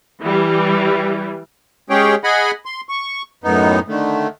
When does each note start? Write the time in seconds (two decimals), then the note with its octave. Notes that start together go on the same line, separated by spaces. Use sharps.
0.21 E3 G3
1.90 G#3 C#4 G4 G#4 C#5 G5
2.24 G#4 D#5 F#5 G#5 B5
2.66 C6
2.89 C#6
3.44 F#2 A2 B3 D#4
3.88 D3 D#3 A3